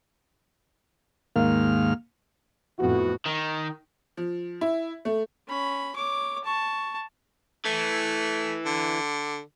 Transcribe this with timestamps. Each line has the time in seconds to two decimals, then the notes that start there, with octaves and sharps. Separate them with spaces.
1.36 D#2 G#2 A#3 F5 F6
2.78 F2 A2 B3 E4 F#4
3.26 D#3
4.17 F3
4.61 E4
5.05 A3
5.48 C#4 B5
5.95 C#5 D6
6.44 A5 C#6
7.65 E3 A3
8.66 D3